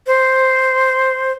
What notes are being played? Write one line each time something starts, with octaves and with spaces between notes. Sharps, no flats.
C5